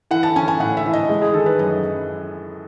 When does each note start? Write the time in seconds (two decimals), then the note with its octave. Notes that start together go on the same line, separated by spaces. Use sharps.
0.11 E3 F#5
0.23 A5
0.36 C#4 G#5
0.48 G#5
0.60 A2 F#5
0.77 E5
0.86 E3
0.93 D#5
1.09 G#3
1.22 G#4
1.34 D#3 A4
1.46 B4
1.59 F#2 D#5